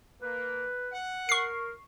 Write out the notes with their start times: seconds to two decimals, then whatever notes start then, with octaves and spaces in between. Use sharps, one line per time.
0.22 A#3 B4
0.92 F#5
1.29 A#4 C#6 C7